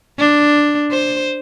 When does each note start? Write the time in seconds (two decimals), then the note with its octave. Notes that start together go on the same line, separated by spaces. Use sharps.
0.19 D4
0.91 C5